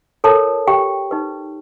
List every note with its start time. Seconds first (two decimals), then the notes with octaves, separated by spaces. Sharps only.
0.24 F4 A4 A#4 C#5 A5
0.67 G4 G5
1.11 D#4 G4 B4